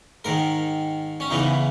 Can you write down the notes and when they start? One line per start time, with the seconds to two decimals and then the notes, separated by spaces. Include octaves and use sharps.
0.24 G#2 D#3 A#4
1.20 C#4
1.31 E2 C#3 E3 D#4